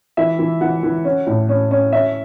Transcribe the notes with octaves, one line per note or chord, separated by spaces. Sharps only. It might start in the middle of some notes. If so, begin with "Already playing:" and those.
E3 E5
E3
E3 F#5
E3
C#4
A2
C#4
C#4
C#4 E5